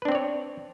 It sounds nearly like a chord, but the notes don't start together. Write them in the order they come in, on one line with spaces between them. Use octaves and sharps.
B4 D4 C4 D5 C#5